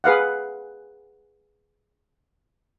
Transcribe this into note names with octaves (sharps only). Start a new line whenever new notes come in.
G#4 B4 F5 F#5